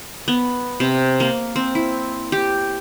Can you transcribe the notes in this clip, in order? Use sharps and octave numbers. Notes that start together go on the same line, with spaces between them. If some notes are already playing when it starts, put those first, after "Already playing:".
B3
C3
A#3
C4
E4
G4